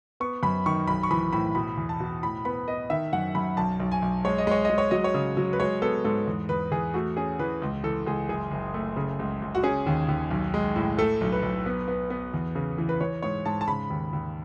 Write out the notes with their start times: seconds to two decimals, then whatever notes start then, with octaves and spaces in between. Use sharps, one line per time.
0.20 B3 C#6
0.43 F#2 B5
0.66 D#3 C#6
0.87 B1 B5
1.03 C#6
1.11 E3 B5
1.33 A2 B5
1.55 B2 B5
1.77 E2
1.89 A5
2.00 B2
2.23 A2 B5
2.45 B3 B5
2.68 B3 D#5
2.90 D#3 E5
3.13 F#2 F#5
3.35 F#2 B5
3.57 B1 A5
3.80 B1
3.92 G#5
4.02 B1
4.25 G#3 C#5
4.38 D#5
4.47 G#3 C#5
4.65 G#3 D#5
4.78 C#5
4.91 F#3 D#5
5.04 C#5
5.14 C#3
5.37 F#3
5.53 B4
5.60 G#3 C#5
5.82 B3 A4
6.05 G#2 A4
6.27 E2
6.49 E2 B4
6.72 E2 G#4
6.94 A3 F#4
7.17 C#4 G#4
7.39 E3 B4
7.62 C#2
7.83 E3 A4
8.06 C#2 G#4
8.29 F#1 G#4
8.51 F#1
8.74 A3
8.96 C#3
9.19 C#2
9.42 C#2
9.55 F#4
9.63 C#4 G#4
9.86 D#2
10.08 D#2
10.31 B1
10.54 G#3
10.76 A2
10.98 A3 A4
11.21 B1
11.32 B4
11.43 B1
11.66 B3
11.88 B3
12.10 B3
12.34 E2
12.55 C#3
12.78 E3
12.89 B4
13.01 E3 C#5
13.22 G#2 C#5
13.45 G#2 A5
13.61 A5
13.68 C#3 B5
13.90 D#2
14.13 D#2